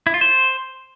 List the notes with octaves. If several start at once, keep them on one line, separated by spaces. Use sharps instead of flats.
E4
F4
C5